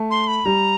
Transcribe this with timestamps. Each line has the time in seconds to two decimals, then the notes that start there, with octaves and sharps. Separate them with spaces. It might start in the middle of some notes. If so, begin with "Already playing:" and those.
Already playing: A3
0.10 C6
0.28 B5
0.46 G3 A#5